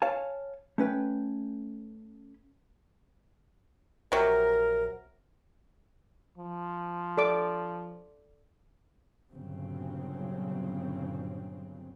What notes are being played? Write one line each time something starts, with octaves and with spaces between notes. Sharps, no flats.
C#5 F5 G#5 A5
A3 C#4 B4 G5
A#1 C3 F#3 A#4
F3
A4 D5 D6
G1 A#2 C#3 F#3 C4